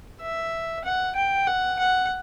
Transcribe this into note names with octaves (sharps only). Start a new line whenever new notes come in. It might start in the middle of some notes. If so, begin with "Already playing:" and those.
E5
F#5
G5
F#5
F#5